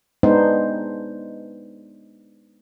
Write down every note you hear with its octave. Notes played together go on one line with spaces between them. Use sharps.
G#3 B3 D4 D#4 C5